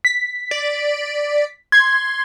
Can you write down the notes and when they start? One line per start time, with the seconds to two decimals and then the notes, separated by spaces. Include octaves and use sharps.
0.05 B6
0.51 D5
1.72 C6 G#6